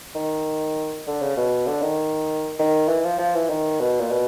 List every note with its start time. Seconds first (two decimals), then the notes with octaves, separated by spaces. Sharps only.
0.15 D#3
1.07 D3
1.22 C#3
1.37 B2
1.67 D3
1.82 D#3
2.59 D#3
2.89 E3
3.04 F3
3.19 F3
3.35 E3
3.50 D#3
3.80 B2
4.00 A#2
4.11 B2